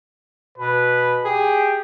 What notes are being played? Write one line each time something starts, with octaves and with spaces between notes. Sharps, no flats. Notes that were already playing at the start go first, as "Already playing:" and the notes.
B2 B4
G4 G#4